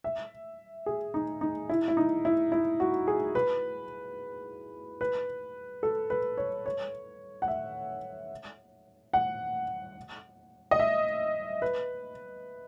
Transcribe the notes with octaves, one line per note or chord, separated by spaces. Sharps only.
E5
G#4
D#4
D#4
E4
E4
D#4
E4
E4
F#4
G#4
B4
B4
A4
B4
C#5
C#5
F#5
E5
F#5
D#5
E5
B4